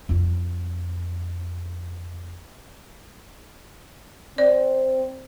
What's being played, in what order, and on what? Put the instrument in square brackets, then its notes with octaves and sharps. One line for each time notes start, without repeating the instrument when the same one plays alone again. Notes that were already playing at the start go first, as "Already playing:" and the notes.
[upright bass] F2 F4
[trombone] C4 [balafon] D5